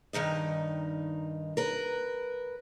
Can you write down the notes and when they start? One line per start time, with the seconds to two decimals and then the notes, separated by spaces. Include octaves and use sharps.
0.13 G2 D#3 D#4 D#5
1.57 A#4 B4